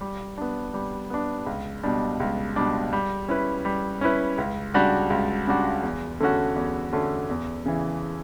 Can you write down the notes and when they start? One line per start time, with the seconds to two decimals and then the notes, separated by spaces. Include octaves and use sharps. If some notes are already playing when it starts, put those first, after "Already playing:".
0.01 G3
0.38 B3 D4
0.74 G3
1.10 B3 D4
1.46 C#2
1.83 B2 G3 D4
2.20 C#2
2.56 B2 G3 D4
2.93 G3
3.28 C#4 E4 B4
3.65 G3
4.01 C#4 E4 B4
4.38 C#2
4.74 C#3 G3 D4 F#4
5.10 C#2
5.47 C#3 G3 D4 F#4
5.83 E2
6.20 D3 A3 C#4 F#4
6.56 E2
6.93 D3 A3 C#4 F#4
7.29 E2
7.66 C#3 E3